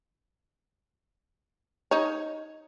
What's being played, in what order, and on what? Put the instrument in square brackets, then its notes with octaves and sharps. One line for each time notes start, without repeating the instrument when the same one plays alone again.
[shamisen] D#4 C#5